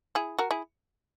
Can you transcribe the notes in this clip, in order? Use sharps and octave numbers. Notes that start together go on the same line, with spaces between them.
E4 G#4
F#4 A#4
E4 G#4